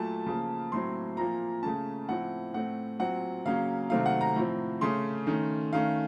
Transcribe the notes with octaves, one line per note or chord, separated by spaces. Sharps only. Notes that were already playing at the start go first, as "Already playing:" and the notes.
Already playing: A#2 F#3 A3 A5
C#3 F3 A#3
A2 F#3 C4 C6
A#2 F3 A#3 A#5
C#3 A3 C#4 A5
A2 F3 C4 F#5
A2 A3 C4 F#5
A#2 F#3 C4 F#5
C#3 F#3 A#3 C#4 F5
C3 D#3 F#3 A3 C4 F5
F#5
A#5
A2 F3 C4
C#3 A3 C#4 C6
D#3 A3 C#4
D#3 A3 C#4 F5